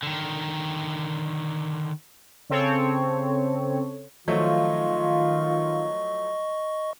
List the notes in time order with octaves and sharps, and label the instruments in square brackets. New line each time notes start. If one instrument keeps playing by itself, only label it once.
[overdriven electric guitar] D3 D#3
[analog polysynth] C#3 C4 A4 C#5
[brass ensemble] D#3 F4 [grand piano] F3 F#3 A3 [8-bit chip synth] D#5 C#6